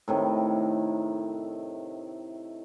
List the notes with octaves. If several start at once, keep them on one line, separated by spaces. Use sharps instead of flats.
A2 C3 D#3